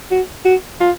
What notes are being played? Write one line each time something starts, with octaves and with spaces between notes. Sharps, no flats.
F#4
F#4
F4